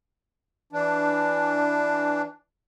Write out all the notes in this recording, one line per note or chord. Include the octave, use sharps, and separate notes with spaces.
E3 D4